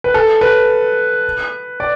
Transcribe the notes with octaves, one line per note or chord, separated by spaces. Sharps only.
B4
A4
B4
D5